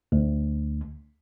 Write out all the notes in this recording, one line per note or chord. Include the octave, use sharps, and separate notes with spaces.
D2